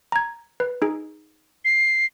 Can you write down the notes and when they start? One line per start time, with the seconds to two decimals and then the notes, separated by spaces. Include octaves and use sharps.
0.12 A#5 G#6
0.60 B4
0.82 D#4 G#4
1.65 C7